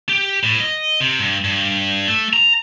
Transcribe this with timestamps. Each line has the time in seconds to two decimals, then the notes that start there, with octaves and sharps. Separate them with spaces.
0.09 G4
0.43 A2
0.60 D#5
1.00 C3
1.20 G2
1.44 G2
2.07 A3
2.33 A#5